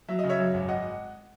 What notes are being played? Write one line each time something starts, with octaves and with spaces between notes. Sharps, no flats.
F#3 E5
C#3 D#5
C#5 E5
F#2
G#1
D#5 F#5